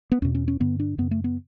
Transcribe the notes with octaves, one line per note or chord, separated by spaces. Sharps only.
B3
E2 B2 C#4
C#4
C#4
G2 D3 B3
D4
F#2 C#3 B3
A3
B3